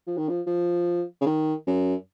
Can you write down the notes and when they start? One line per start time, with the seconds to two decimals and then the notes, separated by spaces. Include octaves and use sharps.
0.07 F3
0.17 D#3
0.29 F3
0.47 F3
1.21 C#3
1.26 D#3
1.67 F#2